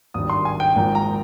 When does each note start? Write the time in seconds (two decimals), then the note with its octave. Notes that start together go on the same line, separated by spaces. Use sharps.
0.14 G#1 G2 D#3 D#6
0.30 C6
0.45 G#5
0.60 G5
0.75 G#1 G#2 F3 A#3 G5
0.95 A#5